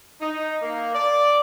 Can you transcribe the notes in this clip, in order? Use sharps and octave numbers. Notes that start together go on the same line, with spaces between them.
D#4
A#3
D5